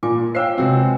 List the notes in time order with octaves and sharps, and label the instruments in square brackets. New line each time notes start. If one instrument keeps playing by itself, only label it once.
[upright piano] A#2 [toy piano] F4 G#5 D6
[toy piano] C5 C#5 F5 [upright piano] G5 E6 C7
[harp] C3 G#3 B3 [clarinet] C4 [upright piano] F#4